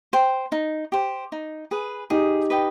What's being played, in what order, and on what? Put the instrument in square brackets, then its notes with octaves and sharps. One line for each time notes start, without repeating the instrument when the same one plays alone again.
[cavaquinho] C5 G5
D#4
G4 C5
D#4
G#4 B4
[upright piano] D#4 G4 [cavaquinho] G#4
[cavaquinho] B4 D#5 G5